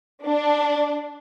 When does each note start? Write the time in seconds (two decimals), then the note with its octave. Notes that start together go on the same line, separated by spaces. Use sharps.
0.25 D4